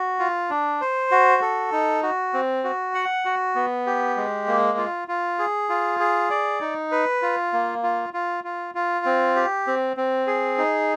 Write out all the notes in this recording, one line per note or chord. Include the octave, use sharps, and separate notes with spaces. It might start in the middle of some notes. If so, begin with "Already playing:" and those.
Already playing: F#4
F4
D4
C5
F#4
A4
D#4
F#4
C4
F#4
F#5
F#4
B3
G4
G#3
A#3
F4
F4
G#4
F4
G#4
D5
D#4
B4
F4
A#3
F4
F4
F4
F4
C4
G4
C4
C4
G#4
D#4